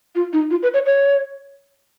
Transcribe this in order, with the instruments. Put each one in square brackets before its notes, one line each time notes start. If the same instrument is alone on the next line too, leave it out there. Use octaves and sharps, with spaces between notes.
[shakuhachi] F4
D#4
F4
B4
C#5
C#5